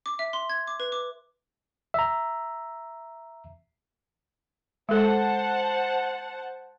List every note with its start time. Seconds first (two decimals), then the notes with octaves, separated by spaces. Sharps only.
0.06 D6
0.19 E5
0.33 C6
0.50 G#6
0.67 D6
0.80 B4
0.92 D6
1.94 E5 A#5
4.89 G#3 A4 C5 F#5 A5